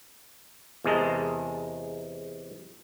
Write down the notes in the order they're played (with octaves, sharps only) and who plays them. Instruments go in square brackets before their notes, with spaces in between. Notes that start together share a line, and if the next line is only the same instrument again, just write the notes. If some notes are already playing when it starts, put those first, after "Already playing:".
[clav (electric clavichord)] E2 C3 G#3 A#4 D#5 A5